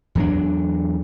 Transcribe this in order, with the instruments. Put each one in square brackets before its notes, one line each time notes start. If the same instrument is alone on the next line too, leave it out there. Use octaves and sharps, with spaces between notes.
[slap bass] E2 F#3 D4